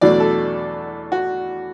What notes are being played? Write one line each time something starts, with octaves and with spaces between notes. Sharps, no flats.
E2 B2 F#3 A3 D4 D5
A4
F#4